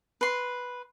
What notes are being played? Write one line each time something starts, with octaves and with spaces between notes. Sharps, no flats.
B4 C6